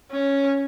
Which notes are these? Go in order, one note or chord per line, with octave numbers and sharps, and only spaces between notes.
C#4